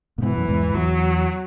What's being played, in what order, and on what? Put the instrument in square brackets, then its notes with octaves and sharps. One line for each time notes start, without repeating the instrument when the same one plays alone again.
[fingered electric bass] A#2
[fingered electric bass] G#2 B2 [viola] E3
[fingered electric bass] F#2
E2 G#2
[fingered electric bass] E2 [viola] F#3